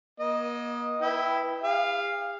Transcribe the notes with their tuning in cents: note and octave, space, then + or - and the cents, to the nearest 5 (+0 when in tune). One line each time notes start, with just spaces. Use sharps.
A#3 +45 D#5 +0
E4 +0 B4 +0 G5 +0
G#4 -45 F5 +0